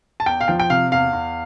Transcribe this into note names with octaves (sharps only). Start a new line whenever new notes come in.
A5
E2 G5
F5
F3 G5
G5
C3 F5
E2 F5
E2